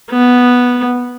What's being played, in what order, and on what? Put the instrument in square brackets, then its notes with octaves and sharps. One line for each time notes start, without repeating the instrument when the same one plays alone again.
[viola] B3